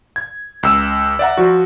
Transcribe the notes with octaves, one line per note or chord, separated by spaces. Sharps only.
G#6
C#2 E6 E7
D5 E5 F#5 A#5
F3 F#4